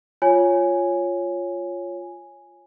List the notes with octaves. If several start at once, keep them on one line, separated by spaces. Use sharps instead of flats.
F4 C#5 G#5